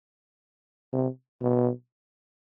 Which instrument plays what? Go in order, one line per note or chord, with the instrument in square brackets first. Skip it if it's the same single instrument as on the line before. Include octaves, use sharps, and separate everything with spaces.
[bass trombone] C3
B2